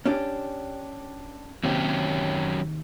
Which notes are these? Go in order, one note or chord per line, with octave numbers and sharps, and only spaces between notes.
C#4 D4 G4
D#2 C3 F#3 C#4 G4